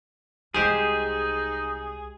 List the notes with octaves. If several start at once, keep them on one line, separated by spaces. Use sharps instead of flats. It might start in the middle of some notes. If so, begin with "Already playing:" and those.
C2 G#3 D#4 G4 G#4 C5